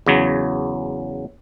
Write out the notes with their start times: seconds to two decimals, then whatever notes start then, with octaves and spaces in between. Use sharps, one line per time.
0.06 E2 C#3 F#3